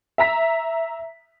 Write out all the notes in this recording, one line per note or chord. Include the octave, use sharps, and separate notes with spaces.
E5 A#5 B6